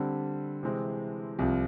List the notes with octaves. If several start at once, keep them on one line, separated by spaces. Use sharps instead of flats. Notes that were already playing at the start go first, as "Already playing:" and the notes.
Already playing: D3 G3 C4
C3 E3 G#3 C4
C2 C3 F3